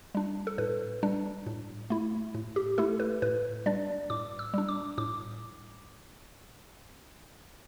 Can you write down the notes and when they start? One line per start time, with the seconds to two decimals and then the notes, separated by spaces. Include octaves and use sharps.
0.15 G3 D4
0.47 A4
0.58 A2 B4
1.03 G3 D4
1.46 A2
1.90 A3 E4
2.34 A2
2.56 G4
2.78 A3 E4 A4
3.00 B4
3.22 A2 B4
3.66 G3 D4 D5
4.10 A2 D6
4.39 E6
4.54 G3 D4
4.68 D6
4.98 A2 D6